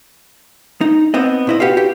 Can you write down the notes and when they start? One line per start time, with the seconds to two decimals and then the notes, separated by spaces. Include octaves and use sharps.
0.81 D#4
1.14 B3 C4 D#5
1.47 A#2 E4 D#5
1.60 F#4 G4 B4 F5
1.77 G4